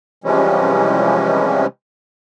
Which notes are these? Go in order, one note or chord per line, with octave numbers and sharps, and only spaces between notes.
C3 E3 F3 G3 G#3 C#4